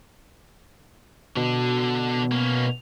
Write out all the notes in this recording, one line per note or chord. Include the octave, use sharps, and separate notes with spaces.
B2 D3 D4
A#3 C#4